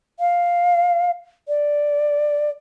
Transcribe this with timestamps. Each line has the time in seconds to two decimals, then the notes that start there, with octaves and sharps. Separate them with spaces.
0.20 F5
1.48 D5